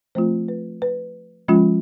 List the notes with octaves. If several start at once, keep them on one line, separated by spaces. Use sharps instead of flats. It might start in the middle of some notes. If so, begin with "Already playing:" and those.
F3 A3 C4 F4 C5
B4
B4
F3 G#3 C#4 F4